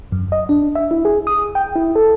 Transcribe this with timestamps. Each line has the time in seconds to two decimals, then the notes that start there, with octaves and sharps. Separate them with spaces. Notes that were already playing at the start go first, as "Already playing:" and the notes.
0.12 F#2
0.32 D#5
0.49 D4
0.75 E5
0.91 E4
1.05 G#4
1.27 D#6
1.55 G5
1.76 E4
1.96 A4